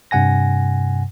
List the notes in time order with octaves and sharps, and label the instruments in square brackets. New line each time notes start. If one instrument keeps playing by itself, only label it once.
[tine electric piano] G2 C3 F#5 G#5 A#6